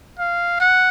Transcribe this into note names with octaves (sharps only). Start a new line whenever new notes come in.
F5
F#5